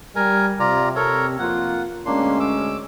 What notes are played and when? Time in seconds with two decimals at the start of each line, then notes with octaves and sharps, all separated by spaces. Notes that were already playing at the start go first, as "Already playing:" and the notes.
0.16 G3 A#4 G#5
0.60 C3 F4 D5 A#5
0.96 A4 A#4 C#5
1.39 F2 A#3 F4 F#5
2.06 D2 G#3 A#3 C#4 D4 C6
2.40 D6 E6